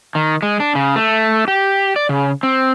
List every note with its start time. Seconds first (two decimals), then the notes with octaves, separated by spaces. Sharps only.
0.15 D#3
0.42 G#3
0.60 D4
0.75 C#3
0.96 A3
1.48 G4
1.96 D5
2.09 C#3
2.43 C4